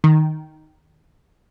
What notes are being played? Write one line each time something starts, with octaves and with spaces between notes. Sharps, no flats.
D#3